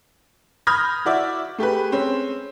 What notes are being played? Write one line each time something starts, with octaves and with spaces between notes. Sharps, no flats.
B5 D#6 F6 G6 G#6 A#6
E4 F#4 D5 E5
A3 G4 G#4 B4
G#3 C4 C#4